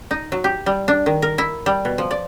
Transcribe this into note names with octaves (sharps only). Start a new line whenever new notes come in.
D#4
F#3
G4
G3
D4
D#3
A#4
E4
G3
B2
F3
D5